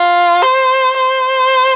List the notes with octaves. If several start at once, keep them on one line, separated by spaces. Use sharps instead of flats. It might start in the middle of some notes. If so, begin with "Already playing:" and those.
Already playing: F4
C5
C5